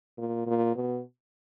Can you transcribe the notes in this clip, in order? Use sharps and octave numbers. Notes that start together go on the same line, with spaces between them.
A#2
A#2
B2